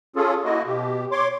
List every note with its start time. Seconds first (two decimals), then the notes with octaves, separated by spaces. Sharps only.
0.16 C#4 F4 G#4 A4
0.45 A#3 E4 F#4 D#5
0.66 B2 G4
1.12 C#5 C6 D6